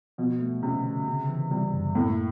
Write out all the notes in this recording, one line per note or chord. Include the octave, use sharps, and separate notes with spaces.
B2 F3
A3
C3 C#4
D3
C#3
E3
C3 G3
F#2
A2 A#3